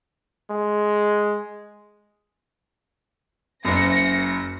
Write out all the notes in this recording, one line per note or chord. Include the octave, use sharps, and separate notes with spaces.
G#3
F#1 F#2 A#6 C#7